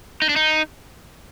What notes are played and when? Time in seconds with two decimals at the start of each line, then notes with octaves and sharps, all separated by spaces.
0.22 D#4
0.29 D4
0.36 D#4